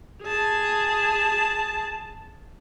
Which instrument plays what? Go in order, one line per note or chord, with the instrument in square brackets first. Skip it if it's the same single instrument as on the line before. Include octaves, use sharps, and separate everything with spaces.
[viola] G#4 A5